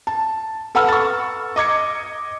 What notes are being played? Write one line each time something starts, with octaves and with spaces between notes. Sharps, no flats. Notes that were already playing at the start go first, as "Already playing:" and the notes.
A5
A4 B4 F#5 B5 E6 F6
C#6 A6
D#5 D6 G#6 C#7